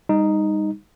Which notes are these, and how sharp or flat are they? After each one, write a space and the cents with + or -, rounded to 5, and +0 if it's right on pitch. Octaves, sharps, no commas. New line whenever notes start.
G3 +40 D#4 +0